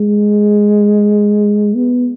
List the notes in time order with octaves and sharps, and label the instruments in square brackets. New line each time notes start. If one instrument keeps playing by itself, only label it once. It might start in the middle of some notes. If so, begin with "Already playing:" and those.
Already playing: [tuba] G#3
B3